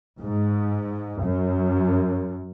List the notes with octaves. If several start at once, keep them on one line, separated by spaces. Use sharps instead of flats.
G#2
F#2